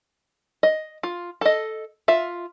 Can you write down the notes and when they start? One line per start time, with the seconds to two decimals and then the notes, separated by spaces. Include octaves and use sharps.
0.63 D#5
1.03 F4
1.41 A4 D#5
2.08 F4 E5